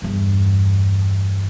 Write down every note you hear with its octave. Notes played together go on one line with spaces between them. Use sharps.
E2 G2